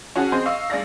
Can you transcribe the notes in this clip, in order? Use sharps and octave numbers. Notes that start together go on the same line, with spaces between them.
C#4 F#4 G#4 F#5 A5
C4 G#4 C5 D#5 C6
D#5 F5 C#6 E6
G2 G#4 D5 F5 A#6